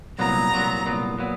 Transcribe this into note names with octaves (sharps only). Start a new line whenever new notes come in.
C2 A#2 F#3 B3 A#5
C2 A#2 F#3 B3
C2 A#2 F#3 B3
A#2 F#3 B3